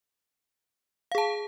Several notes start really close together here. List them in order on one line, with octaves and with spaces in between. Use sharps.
F5 G#4 A5